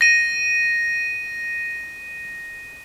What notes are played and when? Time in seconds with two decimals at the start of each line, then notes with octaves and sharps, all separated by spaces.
0.01 A#6 D#7